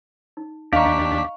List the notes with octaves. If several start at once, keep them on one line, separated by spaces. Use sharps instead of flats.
D#4
D#2 D4 G4 D#5 F5 A#5 C#6 B6